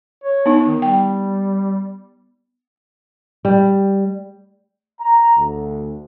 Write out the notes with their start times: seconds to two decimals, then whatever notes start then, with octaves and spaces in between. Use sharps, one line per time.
0.24 C#5
0.46 B3 D#4
0.67 D#3
0.82 G3 G5
3.45 G3
5.00 A#5
5.37 D2